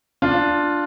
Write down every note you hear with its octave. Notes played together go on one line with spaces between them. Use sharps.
D4 F4